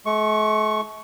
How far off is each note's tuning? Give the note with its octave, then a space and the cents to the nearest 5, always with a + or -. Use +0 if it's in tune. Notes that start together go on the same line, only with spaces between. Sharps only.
A3 -45 C#6 +0